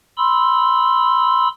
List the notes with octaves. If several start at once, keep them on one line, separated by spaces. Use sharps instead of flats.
B5 C6 E6